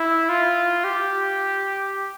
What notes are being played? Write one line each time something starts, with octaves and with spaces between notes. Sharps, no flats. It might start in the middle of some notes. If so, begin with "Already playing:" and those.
Already playing: E4
F4
G4